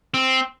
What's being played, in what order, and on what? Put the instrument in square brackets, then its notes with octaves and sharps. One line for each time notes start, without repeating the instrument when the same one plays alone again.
[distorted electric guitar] C4